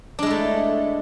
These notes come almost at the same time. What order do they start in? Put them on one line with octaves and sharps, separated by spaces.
D4 G#3 E4 A3